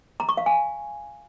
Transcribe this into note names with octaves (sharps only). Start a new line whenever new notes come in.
A#5
C#6
F5
G#5